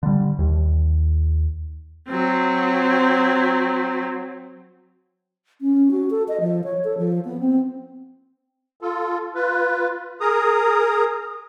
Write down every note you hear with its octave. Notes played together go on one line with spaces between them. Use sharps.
D3 G3
D#2
F#3 C4
C#4
F#4
A4
D#5
F3
C#5
A4
F3
B3
C4
F4 A4
F4 B4
G#4 A#4 A#5 D#6